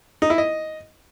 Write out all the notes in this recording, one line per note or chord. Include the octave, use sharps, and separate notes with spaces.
D#4
E4
D#5